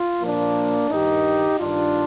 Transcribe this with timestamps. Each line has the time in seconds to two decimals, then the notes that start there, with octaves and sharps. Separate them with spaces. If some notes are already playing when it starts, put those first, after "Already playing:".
Already playing: F4
0.21 A#2 F3 A#3 D4
0.90 G2 D#3 D#4 G4
1.59 G2 D#3 D4 F4